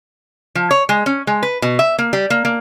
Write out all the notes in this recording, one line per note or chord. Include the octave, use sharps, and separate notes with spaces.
F3
C#5
G#3
C#4
G#3
B4
B2
E5
A#3
G3
A#3
A#3